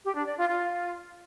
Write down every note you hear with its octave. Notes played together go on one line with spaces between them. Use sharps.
G4
D4
D5
F4
F4